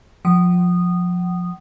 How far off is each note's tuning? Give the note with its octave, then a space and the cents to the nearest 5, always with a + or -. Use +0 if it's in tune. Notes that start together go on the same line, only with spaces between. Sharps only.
F3 +25 F#5 +45 D#6 -15